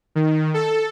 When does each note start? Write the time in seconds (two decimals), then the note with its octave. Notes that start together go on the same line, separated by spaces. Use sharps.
0.15 D#3
0.54 A4